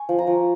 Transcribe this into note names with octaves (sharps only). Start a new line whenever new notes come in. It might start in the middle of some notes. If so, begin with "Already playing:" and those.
Already playing: G#5 C#6
F3
A#5
F3